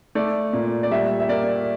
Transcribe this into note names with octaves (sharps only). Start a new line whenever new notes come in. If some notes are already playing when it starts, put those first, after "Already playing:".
A3 D5
A#2
D5
G3 E5
E5
A#3 D5